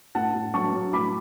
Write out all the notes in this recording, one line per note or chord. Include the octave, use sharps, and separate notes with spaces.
A2 F#5 A5
A2
F#3 A5 C#6
F#3
A2 B5 D6